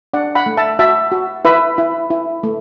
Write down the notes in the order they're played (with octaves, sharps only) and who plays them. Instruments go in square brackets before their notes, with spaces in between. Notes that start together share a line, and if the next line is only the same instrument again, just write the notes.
[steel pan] D4 D5 F#5
F#5 B5
A3
E5 A5
F#4 E5 A5
F#4
E4 B4 E5
E4
E4
A3